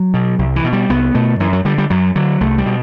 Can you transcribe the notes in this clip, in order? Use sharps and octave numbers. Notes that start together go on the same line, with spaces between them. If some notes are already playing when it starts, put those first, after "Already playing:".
Already playing: F#3
B2
C2
E3
B2
G3
C2 B3
B2 A3
F#2 E3
F#3
D3 G3
G3
F#2 F#3
D3 F#3
C2 A3
G3
B2